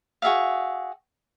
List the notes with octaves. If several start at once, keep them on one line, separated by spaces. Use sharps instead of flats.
F#4 G#4 E5 F5